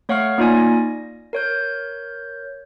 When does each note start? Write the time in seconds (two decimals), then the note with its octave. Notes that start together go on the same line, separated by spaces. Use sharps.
0.09 A3 C#5 F5 F#5 C#6 F6
0.38 A#3 D#4 F4 D5 G#5
0.58 A#6
1.33 A#4 C#5 G6